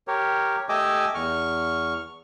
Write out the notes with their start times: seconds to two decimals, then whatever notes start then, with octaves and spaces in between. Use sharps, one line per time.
0.08 G4 A#4 C#5
0.69 A3 G4 D#5 G#5 D6 E6
1.15 E2 C#6 F6